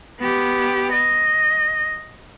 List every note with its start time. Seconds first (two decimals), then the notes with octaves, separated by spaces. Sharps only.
0.20 B3 G4
0.93 D#5